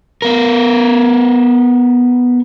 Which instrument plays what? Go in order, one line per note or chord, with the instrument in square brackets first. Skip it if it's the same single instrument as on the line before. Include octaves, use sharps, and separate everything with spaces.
[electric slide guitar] B3 A#4